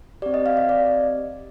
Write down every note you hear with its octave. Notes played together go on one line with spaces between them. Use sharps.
C4 G4 D5
D#5
F5
D#5
D5